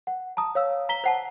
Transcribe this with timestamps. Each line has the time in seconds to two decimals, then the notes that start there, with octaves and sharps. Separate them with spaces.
0.07 F#5
0.37 A5 A#5 D#6
0.55 C#5 F5 E6
0.89 A#5 B6 G7
1.04 C5 F#5 A5